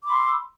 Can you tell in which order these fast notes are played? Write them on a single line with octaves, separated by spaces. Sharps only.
D6 B5 C6 E6